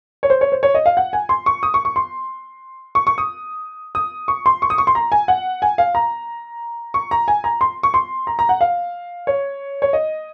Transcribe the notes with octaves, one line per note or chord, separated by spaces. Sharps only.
C#5
C5
C#5
C5
C#5
D#5
F5
F#5
G#5
C6
C#6
D#6
C#6
C#6
C6
C#6
C#6
D#6
D#6
C#6
C6
C#6
D#6
C#6
C6
A#5
G#5
F#5
G#5
F5
A#5
C#6
A#5
G#5
A#5
C6
C#6
C6
A#5
A#5
F#5
F5
C#5
C#5
D#5